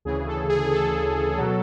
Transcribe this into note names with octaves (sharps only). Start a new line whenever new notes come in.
D2 C#3 E3 G#4
A4
G#4
A4
B2 F#3